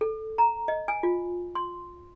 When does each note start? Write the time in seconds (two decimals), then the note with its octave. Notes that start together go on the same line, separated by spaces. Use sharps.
0.01 A4
0.38 A#5
0.68 D#5
0.88 G#5
1.03 F4
1.55 C6